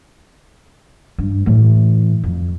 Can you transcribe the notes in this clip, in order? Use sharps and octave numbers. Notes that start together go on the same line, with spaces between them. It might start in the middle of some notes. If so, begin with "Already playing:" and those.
G2
A2 E3
F2